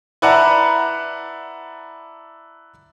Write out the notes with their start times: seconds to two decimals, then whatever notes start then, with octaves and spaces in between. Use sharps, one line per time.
0.22 E4 B4 D5 F#5 A5 A#5